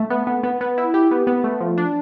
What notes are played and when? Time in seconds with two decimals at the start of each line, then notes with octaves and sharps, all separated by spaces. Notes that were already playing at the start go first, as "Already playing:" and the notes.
Already playing: A3
0.10 B3
0.27 B3
0.43 B3
0.61 B3
0.78 E4
0.94 G4
1.11 B3
1.27 B3
1.44 A3
1.60 F3
1.78 D4